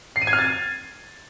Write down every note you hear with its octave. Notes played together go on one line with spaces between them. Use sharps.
C7
D#7
G#6
F6
A6